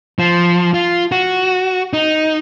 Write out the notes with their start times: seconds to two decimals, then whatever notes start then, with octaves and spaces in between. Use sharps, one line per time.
0.19 F3
0.74 F4
1.12 F#4
1.93 D#4